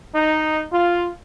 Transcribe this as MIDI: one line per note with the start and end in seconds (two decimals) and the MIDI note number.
0.14 0.63 63
0.72 1.09 65